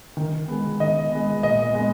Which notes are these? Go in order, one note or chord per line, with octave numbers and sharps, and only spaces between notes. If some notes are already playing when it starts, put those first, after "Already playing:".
D#3
G#3 B3
D#3 D#5
G#3 B3
A#2 D#5
G#3 B3